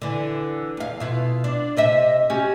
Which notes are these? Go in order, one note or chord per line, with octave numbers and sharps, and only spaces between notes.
D3 E3
E2 F5
B2 E4 F4
D4
C3 D#5 E5
C#4 F#4 G4